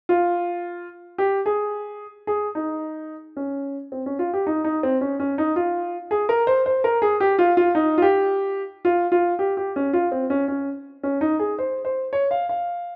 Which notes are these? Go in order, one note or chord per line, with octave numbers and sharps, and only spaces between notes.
F4
G4
G#4
G#4
D#4
C#4
C4
C#4
F4
G4
D#4
D#4
C4
C#4
C#4
D#4
F4
G#4
A#4
C5
C5
A#4
G#4
G4
F4
F4
D#4
F4
G4
F4
F4
G4
G4
C#4
F4
C4
C#4
C#4
C#4
D#4
G#4
C5
C5
C#5
F5
F5